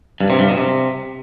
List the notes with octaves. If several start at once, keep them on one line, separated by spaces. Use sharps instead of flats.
G2
C3
G2
B2
C3